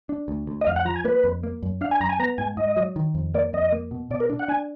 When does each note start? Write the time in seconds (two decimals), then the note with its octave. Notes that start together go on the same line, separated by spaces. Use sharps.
0.09 D4
0.28 D2
0.47 D2
0.61 D#5
0.67 F2 F5
0.76 F#5
0.85 F3 A#5
0.96 G#5
1.04 A#3 B4
1.24 F2
1.43 A#3
1.63 F#2
1.81 D4 F5
1.91 G#5
2.00 F#2 A#5
2.09 G#5
2.19 B3 A#5
2.38 G#2 G#5
2.57 G#2 D#5
2.76 F#3
2.96 D#3
3.15 F2
3.34 A#3 D5
3.53 F2 D#5
3.72 A#3
3.91 B2
4.11 B2 D5
4.20 A#4
4.30 D4
4.39 F#5
4.48 D4 G#5